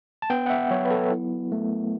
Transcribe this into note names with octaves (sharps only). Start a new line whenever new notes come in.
A5
B3 G5
F#5
E5
F#3 C#5
B4
A4
E4
A3